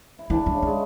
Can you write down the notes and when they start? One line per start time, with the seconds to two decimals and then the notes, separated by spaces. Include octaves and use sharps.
0.19 E4
0.30 D3 E3 D4
0.46 F#3
0.54 C#3 C#4
0.62 E3
0.67 G#3